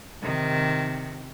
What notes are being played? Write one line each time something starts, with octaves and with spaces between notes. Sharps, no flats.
C3 D#3